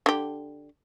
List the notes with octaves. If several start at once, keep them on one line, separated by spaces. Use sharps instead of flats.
D3 G4